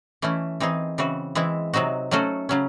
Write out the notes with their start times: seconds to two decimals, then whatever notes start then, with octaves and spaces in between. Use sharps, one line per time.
0.22 E3 A3 C#4 E4
0.60 E3 C4 D#4 G#4
0.98 C#3 E3 C4 F#4
1.35 E3 G#3 C4 E4
1.73 C3 F#3 C4 D#4 F#4
2.11 F#3 A3 C#4 F#4 A4
2.49 C#3 F#3 C#4